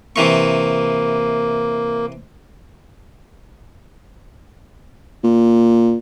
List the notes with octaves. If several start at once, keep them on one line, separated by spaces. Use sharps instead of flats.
C3 E3 A#3 C#6
A#2